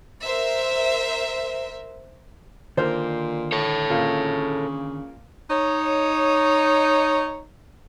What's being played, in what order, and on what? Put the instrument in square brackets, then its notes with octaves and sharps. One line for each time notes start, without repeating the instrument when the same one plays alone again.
[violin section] A#4 C5 E5
[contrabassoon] A#2 [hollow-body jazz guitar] D3 D#3 [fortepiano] A#4 C5
[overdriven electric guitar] A4 C#5
[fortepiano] A#2 A#3 [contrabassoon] C#3
[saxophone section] D#4 C#5